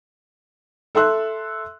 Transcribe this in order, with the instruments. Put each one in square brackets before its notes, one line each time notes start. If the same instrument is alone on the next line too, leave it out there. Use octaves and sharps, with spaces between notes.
[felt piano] A4 E5 C6 E6 F#6